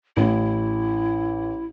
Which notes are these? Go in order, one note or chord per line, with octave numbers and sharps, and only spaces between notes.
A1 E4